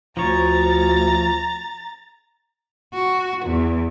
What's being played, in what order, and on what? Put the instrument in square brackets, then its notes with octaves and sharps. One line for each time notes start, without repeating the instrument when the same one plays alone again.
[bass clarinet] D2 [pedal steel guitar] F3 C#5 [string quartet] A#5 A6
[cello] F#4
E2